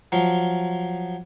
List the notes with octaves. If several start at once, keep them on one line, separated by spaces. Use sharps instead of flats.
F3 F#3 F4